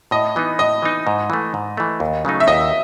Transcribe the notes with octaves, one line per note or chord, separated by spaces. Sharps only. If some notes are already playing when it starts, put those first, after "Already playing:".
A2 D#5
E3 B3 D#4
A2 D#5
E3 B3 D#4
G#2
E3 A3
G#2
E3 A3
D#2
C#3 F#3 A3 D#4
E5
D#2 D#5